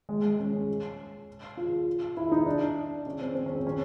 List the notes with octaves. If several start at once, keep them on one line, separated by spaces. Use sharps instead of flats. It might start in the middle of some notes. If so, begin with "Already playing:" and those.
G#3
G#3
C#4
F4
E4
D#4
D4
C#4
C4
C4
C#4
C4
C#4